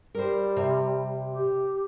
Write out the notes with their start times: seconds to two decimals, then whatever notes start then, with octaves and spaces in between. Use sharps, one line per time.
0.15 G3 A#4 C5
0.56 C3
1.32 G4